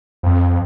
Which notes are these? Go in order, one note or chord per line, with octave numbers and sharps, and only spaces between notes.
F2